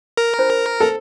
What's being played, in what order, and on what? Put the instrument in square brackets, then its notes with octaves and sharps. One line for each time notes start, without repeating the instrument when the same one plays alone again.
[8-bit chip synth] A#4
[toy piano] D4 F4 C5
[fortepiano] A4